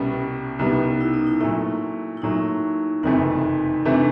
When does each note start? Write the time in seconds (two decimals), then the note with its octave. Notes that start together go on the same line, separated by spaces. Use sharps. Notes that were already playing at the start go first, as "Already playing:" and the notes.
Already playing: C2 B2 G3 B3 C#4
0.59 C2 B2 G3 B3 D#4
1.01 E4
1.14 D#4
1.27 E4
1.40 A#2 F#3 A3 E4
2.17 E4
2.22 A#2 F#3 A3 D#4
3.03 F#1 F2 C3 E3 A3 D#4
3.85 C3 E3 A3 D4